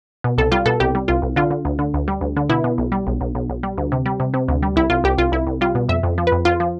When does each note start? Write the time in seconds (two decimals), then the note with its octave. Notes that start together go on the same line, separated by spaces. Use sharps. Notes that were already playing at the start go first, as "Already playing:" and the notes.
0.24 B2
0.38 C2 A4
0.52 G3 F4
0.66 B2 A4
0.80 C2 G4
0.95 G3
1.08 C2 F4
1.22 C2
1.36 D3 F4
1.51 D3
1.65 D2
1.79 D3
1.94 D2
2.08 G3
2.21 D2
2.36 D3
2.49 B2 E4
2.64 B2
2.78 B1
2.92 G3
3.07 B1
3.21 B1
3.35 B1
3.50 B1
3.63 G3
3.78 D2
3.92 C3
4.06 G3
4.20 C3
4.34 C3
4.48 D2
4.63 G3
4.76 C2 E4
4.90 C2 F4
5.04 C2 G4
5.18 C2 F4
5.32 C2 E4
5.47 C2
5.61 G3 F4
5.75 B2
5.89 F2 E5
6.03 F2
6.18 F3
6.27 B4
6.32 F2
6.45 F2 F4
6.60 F3